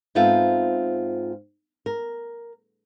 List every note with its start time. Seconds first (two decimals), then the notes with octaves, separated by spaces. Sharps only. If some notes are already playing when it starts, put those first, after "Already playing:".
0.15 G#2 B3 C4 F4 A4 E5
1.86 A#4